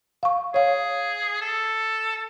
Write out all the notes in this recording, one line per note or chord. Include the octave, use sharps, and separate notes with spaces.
F5 C#6
G#4 C#5 F5
A4